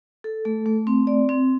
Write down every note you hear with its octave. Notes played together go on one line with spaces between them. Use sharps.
A4
A3
A3
C4
D5
C4